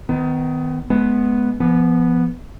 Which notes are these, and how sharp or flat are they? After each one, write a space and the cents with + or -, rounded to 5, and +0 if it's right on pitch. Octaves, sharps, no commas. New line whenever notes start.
D#3 +10 B3 +30
G#3 +35 B3 +0
F3 -35 B3 -5